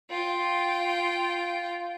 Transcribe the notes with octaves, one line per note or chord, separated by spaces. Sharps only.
F4 G5